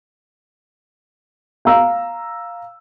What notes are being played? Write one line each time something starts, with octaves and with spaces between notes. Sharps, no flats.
F5 A#5 E6